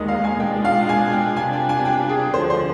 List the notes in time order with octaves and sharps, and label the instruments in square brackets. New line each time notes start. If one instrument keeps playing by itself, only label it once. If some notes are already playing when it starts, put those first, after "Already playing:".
Already playing: [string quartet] D#2 D#3 G#3 [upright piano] D#5
[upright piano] F5
G#5
[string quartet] B2 G#3 D4 F4 [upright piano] G5
[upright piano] F5
G#5
G5
[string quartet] C3 G3 D4 F4 [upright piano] G#5
[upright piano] G5
G#5
G5
G#4
[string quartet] D2 D3 F3 [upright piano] C5
[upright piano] C5